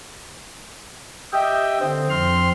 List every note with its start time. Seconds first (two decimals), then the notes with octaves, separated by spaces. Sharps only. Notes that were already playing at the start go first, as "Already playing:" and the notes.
1.33 G4 D#5 E5 G5
1.81 D3 C4
2.10 F2 C6 F6